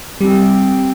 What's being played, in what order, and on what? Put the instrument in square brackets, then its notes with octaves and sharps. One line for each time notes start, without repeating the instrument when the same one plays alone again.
[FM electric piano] G3 [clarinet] C4